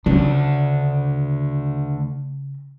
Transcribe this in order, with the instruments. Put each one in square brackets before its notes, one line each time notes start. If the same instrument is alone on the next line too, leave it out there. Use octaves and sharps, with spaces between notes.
[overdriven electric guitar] D2 D4 [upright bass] C#3